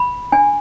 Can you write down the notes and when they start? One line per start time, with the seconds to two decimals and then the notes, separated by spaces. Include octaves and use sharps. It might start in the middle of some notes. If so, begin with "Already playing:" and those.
Already playing: B5
0.32 D4 G#5